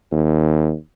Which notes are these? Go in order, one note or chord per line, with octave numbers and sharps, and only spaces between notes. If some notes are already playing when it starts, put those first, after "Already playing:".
D#2